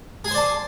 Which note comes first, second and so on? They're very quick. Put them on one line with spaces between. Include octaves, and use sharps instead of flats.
G#4 G#5 C5 D5 A5